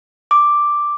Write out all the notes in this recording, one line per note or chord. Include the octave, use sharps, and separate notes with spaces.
D6